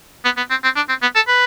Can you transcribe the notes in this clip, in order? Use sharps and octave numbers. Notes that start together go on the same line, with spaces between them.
B3
B3
C4
C4
D4
C4
B3
A4
B4